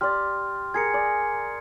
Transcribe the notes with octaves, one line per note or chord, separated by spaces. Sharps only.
G4 D5 C6 F6
G#4 A#4 G#6 C7 C#7
D5